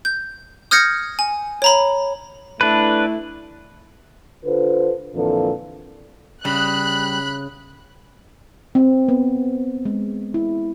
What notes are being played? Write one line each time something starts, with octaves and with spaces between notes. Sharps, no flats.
G6
D#6 F6 G6 G#6 A#6 C#7
G#5
C#5 A#5 B5
A3 D4 E4 B4
D3 F4 A4 B4 C5
F2 A#2 D3 E3 F4 A4
C#3 G3 B5 F#6
C4
B3
G#3
E4